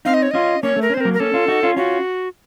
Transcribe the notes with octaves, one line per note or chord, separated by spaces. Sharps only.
C4 D#4 F5
D#5
C#5
C#4 F4 D#5
A#3 C#4 C#5
A3
A#4
C#4
C5
C4
A#4
F#3 A#3
A#4
A#3 C#4 A4
C#4 F4
D#4 F#4
C#4 F4
C#4 F4 F#4